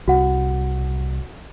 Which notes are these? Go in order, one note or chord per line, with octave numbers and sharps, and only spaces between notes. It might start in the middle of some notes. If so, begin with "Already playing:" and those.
C2 F#4 F#5